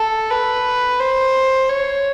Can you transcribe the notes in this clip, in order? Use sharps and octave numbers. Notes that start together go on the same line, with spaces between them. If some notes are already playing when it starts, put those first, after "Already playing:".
Already playing: A4
B4
C5
C#5